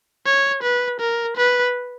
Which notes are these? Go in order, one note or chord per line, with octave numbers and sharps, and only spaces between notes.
C#5
B4
A#4
B4